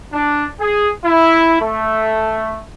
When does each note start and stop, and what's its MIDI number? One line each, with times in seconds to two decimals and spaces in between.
0.13 0.46 62
0.61 0.89 68
1.05 1.57 64
1.61 2.61 57